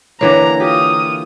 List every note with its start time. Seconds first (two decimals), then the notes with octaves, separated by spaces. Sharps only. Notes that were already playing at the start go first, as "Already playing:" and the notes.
0.21 D3 E3 A#3 C#5 A#5 D6
0.60 F4 G4 D#6